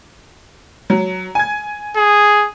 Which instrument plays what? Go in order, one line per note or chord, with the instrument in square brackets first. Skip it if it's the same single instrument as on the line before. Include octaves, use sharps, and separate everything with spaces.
[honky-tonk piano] F#3
G#5 G#6
[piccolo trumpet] G#4